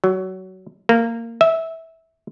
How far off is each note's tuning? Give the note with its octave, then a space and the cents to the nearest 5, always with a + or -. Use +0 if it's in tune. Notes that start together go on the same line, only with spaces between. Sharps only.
F#3 +20
A#3 -15
E5 -15